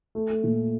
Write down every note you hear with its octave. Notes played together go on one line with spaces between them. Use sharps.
A3
A3
A#2